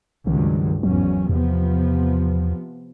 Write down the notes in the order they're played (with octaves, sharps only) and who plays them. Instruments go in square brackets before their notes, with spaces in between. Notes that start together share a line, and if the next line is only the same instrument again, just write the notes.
[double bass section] C#2 G2 F#3 [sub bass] D#3
[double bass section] G#1 E2 C#4 [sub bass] F#3
[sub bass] E2 [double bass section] C3 F3 B3